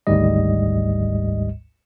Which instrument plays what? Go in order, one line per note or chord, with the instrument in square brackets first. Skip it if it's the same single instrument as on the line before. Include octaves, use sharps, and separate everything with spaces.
[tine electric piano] G#1 D2 G#2 G3 D#5